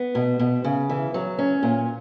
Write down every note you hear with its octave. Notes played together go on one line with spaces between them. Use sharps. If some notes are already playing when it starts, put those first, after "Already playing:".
Already playing: B3
B2
B2
C#3
E3
F#3
C#4
A#2